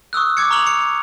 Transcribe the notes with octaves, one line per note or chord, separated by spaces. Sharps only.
C#6 D#6 E6 F#6
D6 G#6 C#7
A#5 C#6 F6 F7 F#7
C#7